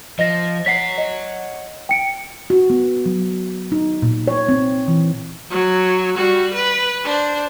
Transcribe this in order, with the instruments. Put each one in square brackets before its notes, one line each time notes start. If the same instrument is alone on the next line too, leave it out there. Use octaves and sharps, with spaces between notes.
[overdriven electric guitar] F3 [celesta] D#5 A#6
[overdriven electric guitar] C#5 F#5 [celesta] B6 C7
[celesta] D#5
G5 C#7 D7
[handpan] F#4
B3
F#3
D#4
A#2
C#5
C4
E3
[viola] F#3
G3 F#4
B4
D4 C5